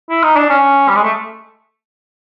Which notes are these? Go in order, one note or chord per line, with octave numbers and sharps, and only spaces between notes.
E4
D#4
D4
C#4
G3
G#3
A3